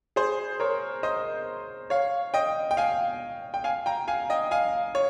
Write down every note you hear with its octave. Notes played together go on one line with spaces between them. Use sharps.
G#4 C5
A#4 C#5
C5 D#5
C#5 F5
D#5 G5
G5
F5 G#5
G5
F5 G#5
G5 A#5
F5 G#5
D#5 G5
F5 G#5
C#5